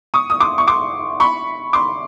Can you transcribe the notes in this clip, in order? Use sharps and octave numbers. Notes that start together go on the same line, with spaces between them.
C#6 D#6
D#6
C6 D6
C#6
C6 D6
B5 C#6
C6 D6